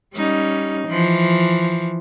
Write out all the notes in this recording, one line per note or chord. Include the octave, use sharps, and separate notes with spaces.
G3 C#4 D#4
E3 F3